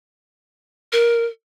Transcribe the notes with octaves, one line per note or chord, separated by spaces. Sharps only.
A#4